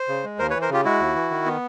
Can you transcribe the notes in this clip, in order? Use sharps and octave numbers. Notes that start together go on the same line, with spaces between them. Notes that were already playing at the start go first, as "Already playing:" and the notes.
Already playing: C5
C#3
G#3
D#2 A#4 C5
B4 C#5
E3
A#4 C5
C#3 F4 G4
G#3 E4 F#4
D#2
E3
D#3
B3